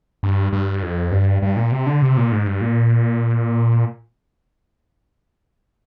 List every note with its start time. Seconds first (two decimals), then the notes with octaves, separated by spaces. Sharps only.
0.23 G2
0.53 G2
0.83 F2
1.12 G2
1.42 G2
1.57 A#2
1.72 C3
1.86 D3
2.02 C3
2.17 A#2
2.32 G#2
2.47 G2
2.61 A#2